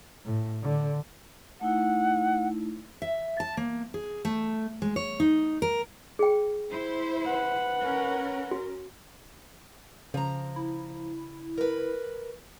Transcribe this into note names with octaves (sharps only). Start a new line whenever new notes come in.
A2
D3
A3 D#4 E4 F#5
E5
A5
A#3
G#4
A3
G#3
C#5
D#4
A#4
G#4 G5
E4 C5
B4 F#5
C#4 A#4
F#4
C#3 F3 A#5
E4
A#4 B4